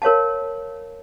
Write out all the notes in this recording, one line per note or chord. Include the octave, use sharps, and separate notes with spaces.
A#4 C#5 F5 A5